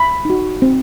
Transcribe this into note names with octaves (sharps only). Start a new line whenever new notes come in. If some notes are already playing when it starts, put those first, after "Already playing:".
Already playing: B5
D#4 F#4
C4